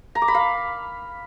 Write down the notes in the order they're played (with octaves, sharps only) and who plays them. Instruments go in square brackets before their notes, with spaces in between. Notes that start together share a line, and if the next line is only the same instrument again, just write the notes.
[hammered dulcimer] A#5
D6
B5
F5